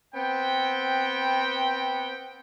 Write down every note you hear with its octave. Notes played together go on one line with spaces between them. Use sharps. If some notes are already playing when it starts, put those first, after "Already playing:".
B3 C4 G5